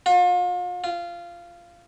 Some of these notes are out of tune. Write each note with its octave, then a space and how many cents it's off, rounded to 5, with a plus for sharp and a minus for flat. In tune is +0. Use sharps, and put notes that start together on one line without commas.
F4 +40
F4 -15